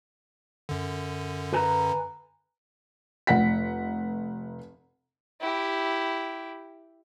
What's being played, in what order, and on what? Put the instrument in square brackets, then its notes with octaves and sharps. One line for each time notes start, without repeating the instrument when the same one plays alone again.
[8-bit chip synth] F#2 D3
[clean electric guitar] B4 G#5 A#5
[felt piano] F1 F#5 B6
[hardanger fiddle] E4 G4